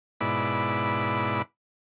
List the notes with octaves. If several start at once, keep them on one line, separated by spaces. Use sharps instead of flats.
G#2 B2 E4 D5 B5